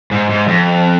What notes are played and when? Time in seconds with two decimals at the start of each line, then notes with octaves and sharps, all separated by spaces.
0.11 G#2
0.30 G#2
0.48 F2